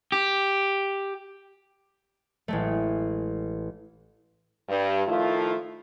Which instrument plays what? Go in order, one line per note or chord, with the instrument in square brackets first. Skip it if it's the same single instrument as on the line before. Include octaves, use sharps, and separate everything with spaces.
[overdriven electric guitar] G4
[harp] A1 G#3 A3
[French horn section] G2
D#3 F3 A3 E4 F4